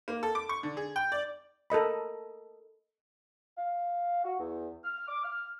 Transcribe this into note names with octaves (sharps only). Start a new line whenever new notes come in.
A#3
A4
D6
C#6
D3
G#4
G5
D5
A4 A#4 D#5 B5
F5
F#4
E2
F6
D6
F6